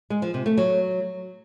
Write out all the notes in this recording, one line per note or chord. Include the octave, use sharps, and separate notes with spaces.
G#3
F3
C3
A3
F#3